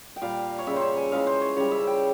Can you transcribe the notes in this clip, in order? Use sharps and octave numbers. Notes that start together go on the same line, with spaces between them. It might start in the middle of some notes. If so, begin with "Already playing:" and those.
G5
A#2 G3 F5
C#5
C#3 G3 E5
C5
C#5
G#5
C#3 E3 G#3 F5
C5
C#5
C#3 G3 C#5
E5
G5